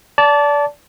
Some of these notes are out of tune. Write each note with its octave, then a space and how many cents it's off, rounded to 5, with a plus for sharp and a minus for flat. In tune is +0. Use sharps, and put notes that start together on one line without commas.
D5 -25 A5 -5